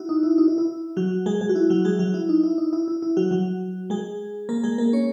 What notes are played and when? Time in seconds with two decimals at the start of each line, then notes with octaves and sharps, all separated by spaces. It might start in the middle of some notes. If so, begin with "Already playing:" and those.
Already playing: E4 F#4
0.09 D#4
0.23 E4
0.38 D#4
0.48 E4
0.58 E4
0.97 F#3 F#4
1.26 G#3 G#4
1.40 G#3 G#4
1.49 F#4
1.55 E4
1.70 F#3 F#4
1.85 G#3 G#4
1.99 F#3 F#4
2.14 E4
2.29 D#4
2.43 E4
2.58 D#4
2.73 E4
2.88 E4
3.02 E4
3.17 F#3 F#4
3.31 F#3 F#4
3.90 G#3 G#4
4.49 A#3 A#4
4.64 G#3 G#4
4.78 A#3 A#4
4.93 C#4 C#5